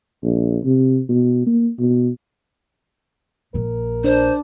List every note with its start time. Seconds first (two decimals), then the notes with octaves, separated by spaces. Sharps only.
0.23 A#1
0.64 C3
1.09 B2
1.46 A#3
1.79 B2
3.54 A#1 A#3 A#4
4.04 D4 C5